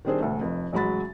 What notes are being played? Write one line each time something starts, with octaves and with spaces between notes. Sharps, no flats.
D#3 G3 C4 D4 G#4 C5
E1 D2 A3
F1 F2
A1 F#3 G#3 F#4 B5 A6